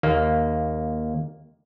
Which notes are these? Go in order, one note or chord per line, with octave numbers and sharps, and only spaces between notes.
D#2 A#3